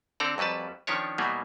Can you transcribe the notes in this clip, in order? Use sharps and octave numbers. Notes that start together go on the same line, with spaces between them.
D3 C4 A4 D5 A#5
F2 F#3 G3 B4 A5
D#3 F3 C#4 D4 C#5
B2 E3 F#3 G3 A#3 B3